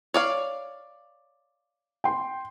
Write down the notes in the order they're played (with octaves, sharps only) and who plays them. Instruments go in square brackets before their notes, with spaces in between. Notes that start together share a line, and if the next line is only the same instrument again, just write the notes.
[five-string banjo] C#5 D5 F5
[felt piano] G5 C6